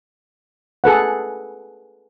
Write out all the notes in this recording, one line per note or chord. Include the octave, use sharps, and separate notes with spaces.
G#4 A4 B4 F#5